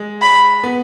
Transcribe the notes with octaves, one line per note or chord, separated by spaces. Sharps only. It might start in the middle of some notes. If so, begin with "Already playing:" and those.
Already playing: G#3
B5
B3